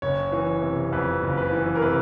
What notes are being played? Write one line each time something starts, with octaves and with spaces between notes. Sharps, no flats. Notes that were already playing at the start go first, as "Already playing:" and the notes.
F#1 C#5
E3
C3
F2 B4
F#1
B4
E3
A#4
C3 B4